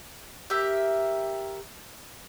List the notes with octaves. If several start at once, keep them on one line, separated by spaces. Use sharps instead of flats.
G4 A#4 E5